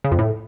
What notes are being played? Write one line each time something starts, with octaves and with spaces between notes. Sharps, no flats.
C#3
F2
A2